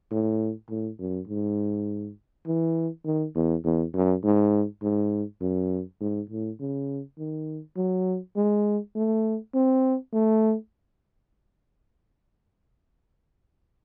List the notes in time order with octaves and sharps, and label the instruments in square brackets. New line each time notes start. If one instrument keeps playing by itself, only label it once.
[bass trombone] A2
A2
F#2
G#2
E3
D#3
E2
E2
F#2
G#2
G#2
F#2
G#2
A2
C#3
D#3
F#3
G#3
A3
C4
A3